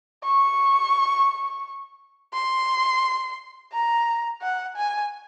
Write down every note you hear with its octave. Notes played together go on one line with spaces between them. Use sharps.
C#6
C6
A#5
F#5
G#5